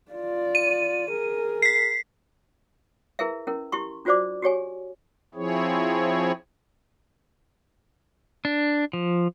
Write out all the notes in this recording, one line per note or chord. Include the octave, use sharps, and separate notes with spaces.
F4 D5
D#7
G#4 A#4
B6 C7
E4 G#4 A#4 B4 E5
C#4 E4 A#4
E4 G4 C6 C#6
D4 F4 F#4 C5 D5 D6
F#4 G4 C#5 G#5
F3 C4 E4 G#4 C#5
D4
F3